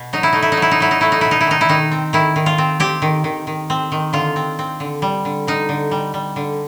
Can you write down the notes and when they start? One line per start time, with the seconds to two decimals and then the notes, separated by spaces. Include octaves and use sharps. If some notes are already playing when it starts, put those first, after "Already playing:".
Already playing: B2
0.13 F#3 D#4
0.23 E4
0.33 A3 D#4
0.42 E4
0.52 D#4
0.57 F#3
0.62 E4
0.71 D#4
0.80 F#3 E4
0.91 D#4
1.01 A3 E4
1.12 D#4
1.21 B2 E4
1.31 D#4
1.41 E4
1.47 D#3 D#4
1.61 E4
1.69 D#3 D#4
1.91 C4
2.13 D#3 E4
2.36 D#3
2.46 F4
2.58 C4
2.80 C4 G4
3.02 D#3
3.24 D#3
3.47 D#3
3.70 C4
3.92 D#3
4.13 D3 F4
4.36 C4
4.59 C4
4.80 D3
5.02 G3
5.25 D3
5.47 D3 D#4
5.69 D3
5.91 G3
6.14 G3
6.36 D3